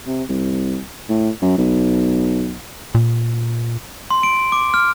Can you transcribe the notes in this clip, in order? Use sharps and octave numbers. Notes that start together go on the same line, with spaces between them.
C3
C2
A2
F#2
B1
A#2
C6
D7
D6
F6